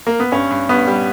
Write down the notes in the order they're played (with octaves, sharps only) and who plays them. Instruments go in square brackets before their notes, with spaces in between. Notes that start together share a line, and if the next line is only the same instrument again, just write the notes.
[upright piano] A#3
B3
G2 C#4
G2
G2 B3
G3